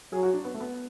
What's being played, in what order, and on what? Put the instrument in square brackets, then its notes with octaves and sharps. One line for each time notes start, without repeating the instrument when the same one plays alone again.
[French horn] F#3 [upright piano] G#4
[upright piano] F#4
D4
B3
A3
B3